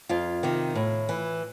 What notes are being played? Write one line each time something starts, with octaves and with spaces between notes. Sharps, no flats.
F2 F4
C3 D#3
A2
E3